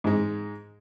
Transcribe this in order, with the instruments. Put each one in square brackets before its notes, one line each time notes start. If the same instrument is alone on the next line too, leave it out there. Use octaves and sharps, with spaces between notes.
[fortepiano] G#2 G#3